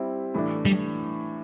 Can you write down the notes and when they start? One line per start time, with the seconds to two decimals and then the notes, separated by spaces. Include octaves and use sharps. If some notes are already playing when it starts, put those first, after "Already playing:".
Already playing: G3 C4 E4
0.34 A2 E3 A3 D4
0.65 G3